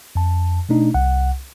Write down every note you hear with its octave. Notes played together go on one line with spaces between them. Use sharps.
F2 A5
B2 A3 D4 D#4
C2 F#5